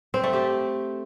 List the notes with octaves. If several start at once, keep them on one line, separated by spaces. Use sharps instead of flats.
C4
A3
G4